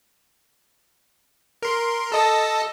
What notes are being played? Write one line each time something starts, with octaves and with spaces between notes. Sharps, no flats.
A#4 C6
A4 D#5 A5